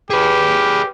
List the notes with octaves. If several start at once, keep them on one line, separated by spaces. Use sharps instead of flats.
G4 G#4 B4